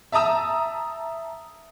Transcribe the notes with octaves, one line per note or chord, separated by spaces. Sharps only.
E5 A5 A#5 D#6 E6